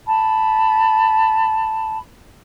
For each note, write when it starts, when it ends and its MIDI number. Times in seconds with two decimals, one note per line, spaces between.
0.06 1.98 81
0.06 1.98 83